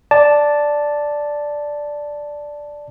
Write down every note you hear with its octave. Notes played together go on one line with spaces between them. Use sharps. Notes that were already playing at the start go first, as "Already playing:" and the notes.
D5 A5